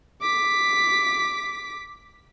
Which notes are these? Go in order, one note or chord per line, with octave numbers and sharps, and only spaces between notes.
D6 B6